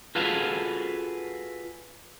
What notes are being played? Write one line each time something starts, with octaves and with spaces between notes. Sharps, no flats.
F4 F#4 G#4 A4 B4 F5